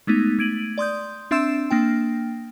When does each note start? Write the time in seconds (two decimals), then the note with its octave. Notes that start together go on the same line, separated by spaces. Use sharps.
0.07 G#3 A3 B3 D#4
0.39 A3 G#6 D7 D#7 F#7
0.78 D5 C6 D#6 G6
1.31 C4 D4 E5 C6 E6 E7
1.70 A#3 D4 G5